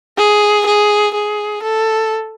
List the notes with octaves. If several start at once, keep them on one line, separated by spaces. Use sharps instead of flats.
G#4
G#4
G#4
A4